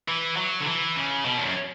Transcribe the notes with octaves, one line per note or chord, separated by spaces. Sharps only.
E3
F#3
D3
E3
C#3
B2
E2
F#2